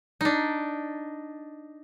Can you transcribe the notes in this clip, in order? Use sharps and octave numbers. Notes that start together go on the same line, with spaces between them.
D4 D#4